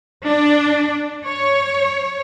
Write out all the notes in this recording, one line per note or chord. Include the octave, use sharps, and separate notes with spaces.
D4
C#5